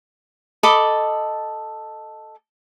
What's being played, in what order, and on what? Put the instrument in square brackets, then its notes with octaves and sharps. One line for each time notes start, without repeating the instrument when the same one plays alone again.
[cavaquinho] A4 D#5 B5 D6